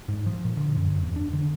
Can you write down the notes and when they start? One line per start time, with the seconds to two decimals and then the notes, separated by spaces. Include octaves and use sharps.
0.08 G#2
0.26 F3
0.45 A#2
0.57 D3
0.76 F#2
0.90 F#2
1.03 E2
1.16 D4
1.33 D3